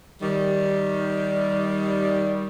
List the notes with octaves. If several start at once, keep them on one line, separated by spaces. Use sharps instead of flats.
D#3 G3